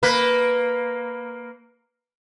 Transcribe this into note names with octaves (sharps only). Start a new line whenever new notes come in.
A#3 B4